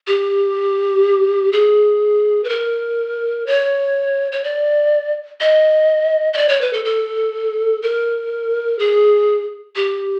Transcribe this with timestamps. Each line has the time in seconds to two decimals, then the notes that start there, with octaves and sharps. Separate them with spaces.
0.07 G4
1.53 G#4
2.44 B4
2.49 A#4
3.46 C#5
4.32 C#5
4.44 D5
5.41 D#5
6.33 D#5
6.37 D5
6.49 C#5
6.61 B4
6.73 A4
6.85 A4
7.82 A#4
8.79 G#4
9.76 G4